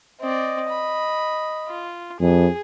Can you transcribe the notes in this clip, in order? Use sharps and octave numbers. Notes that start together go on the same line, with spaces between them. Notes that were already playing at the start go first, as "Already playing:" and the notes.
C4 D5 D#5
B5
F4
F2 G#4